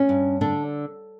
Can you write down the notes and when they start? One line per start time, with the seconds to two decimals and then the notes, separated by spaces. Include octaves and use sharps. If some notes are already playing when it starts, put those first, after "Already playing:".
Already playing: C#4
0.09 G2
0.41 D3 D4